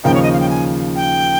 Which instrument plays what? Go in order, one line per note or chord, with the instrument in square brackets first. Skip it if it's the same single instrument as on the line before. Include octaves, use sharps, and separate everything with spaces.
[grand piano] D#2 C#3 F3 A#3 D#4 [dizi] G5
[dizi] C#5
D#5
F5
G5
G#5
G5